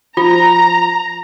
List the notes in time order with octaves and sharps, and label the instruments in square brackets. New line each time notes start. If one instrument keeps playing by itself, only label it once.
[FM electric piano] F3 [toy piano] F4 [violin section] A#5